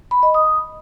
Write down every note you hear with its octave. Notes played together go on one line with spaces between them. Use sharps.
B5
D#5
D#6